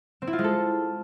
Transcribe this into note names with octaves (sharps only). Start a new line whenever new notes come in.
C4
E4
F4
G#3
A4